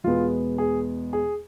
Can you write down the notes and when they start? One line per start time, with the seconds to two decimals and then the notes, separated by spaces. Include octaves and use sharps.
0.04 E2 B2 G#3 B3 F4
0.58 G#4
1.13 G#4